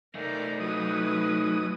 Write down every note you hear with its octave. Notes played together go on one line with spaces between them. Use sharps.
A3 D#4 A#4 D5
F#3 E4 B4 D#6